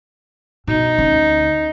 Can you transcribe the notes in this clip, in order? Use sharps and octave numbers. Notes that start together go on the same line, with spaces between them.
B2 D#4
D2 C#4